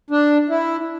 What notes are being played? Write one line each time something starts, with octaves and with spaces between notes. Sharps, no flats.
D4
E4